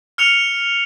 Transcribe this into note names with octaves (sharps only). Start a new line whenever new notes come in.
F6 C#7 F7